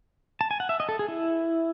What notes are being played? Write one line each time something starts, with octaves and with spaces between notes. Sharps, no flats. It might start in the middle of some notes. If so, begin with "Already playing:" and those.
A5
G#5
F#5
E5
D#5
A4
G#4
E4